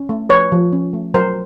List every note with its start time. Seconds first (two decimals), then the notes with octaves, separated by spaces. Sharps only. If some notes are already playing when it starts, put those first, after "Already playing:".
Already playing: C#4
0.09 A3
0.29 F3 B4 C#5
0.52 F3
0.73 C#4
0.93 A3
1.14 F#3 A#4 C5